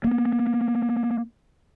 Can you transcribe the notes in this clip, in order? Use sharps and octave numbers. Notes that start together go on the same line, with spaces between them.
A#3 B3